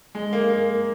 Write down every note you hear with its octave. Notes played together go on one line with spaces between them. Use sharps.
G#3
A#3
A#3